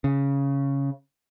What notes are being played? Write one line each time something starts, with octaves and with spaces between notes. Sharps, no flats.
C#3